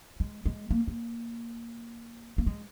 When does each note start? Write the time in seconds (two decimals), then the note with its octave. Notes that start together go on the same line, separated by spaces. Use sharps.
0.20 G#3
0.46 G#3
0.71 A#3
0.87 A#3
2.38 A#3
2.46 G#3